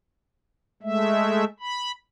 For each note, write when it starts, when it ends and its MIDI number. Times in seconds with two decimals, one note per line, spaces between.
0.83 1.44 56
0.83 1.44 57
0.83 1.44 76
1.60 1.92 83